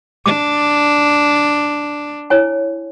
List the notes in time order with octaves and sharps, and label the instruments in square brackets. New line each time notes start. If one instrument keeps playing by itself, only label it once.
[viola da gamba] D4 [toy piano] D6
[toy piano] E4 C#5 G#5